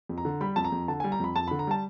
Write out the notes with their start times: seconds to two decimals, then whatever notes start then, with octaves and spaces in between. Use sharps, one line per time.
0.09 F2
0.18 A#5
0.25 D3
0.41 G3 B5
0.56 F2 A5
0.65 A#5
0.72 F2
0.88 D3 A5
1.00 G3 G#5
1.12 A#5
1.20 F2 B5
1.36 F2 A5
1.48 D3 B5
1.59 A#5
1.67 G3 A5